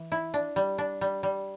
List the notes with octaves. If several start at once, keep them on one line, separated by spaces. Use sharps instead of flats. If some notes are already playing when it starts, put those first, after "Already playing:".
Already playing: E3
E4
D4
G3
D4
G3
G3